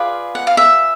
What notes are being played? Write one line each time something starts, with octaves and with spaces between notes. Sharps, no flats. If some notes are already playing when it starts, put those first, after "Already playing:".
Already playing: F4 G#4 B4 D5 F5
F#5
F5
E5